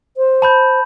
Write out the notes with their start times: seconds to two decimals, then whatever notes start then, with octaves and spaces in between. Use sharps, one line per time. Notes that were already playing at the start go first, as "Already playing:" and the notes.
0.17 C5
0.42 A5 B5 G6